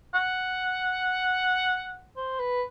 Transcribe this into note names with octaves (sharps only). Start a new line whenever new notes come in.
F#5
C5
B4